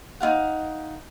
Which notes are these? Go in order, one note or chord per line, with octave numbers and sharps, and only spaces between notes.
D#4 F4 F5 F#5